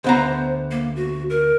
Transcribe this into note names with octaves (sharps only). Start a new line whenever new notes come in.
D2 B3 C5 A#5
A#3
F#4
A#4